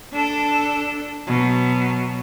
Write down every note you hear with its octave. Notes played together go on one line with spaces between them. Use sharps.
D4 A4
B2 F#3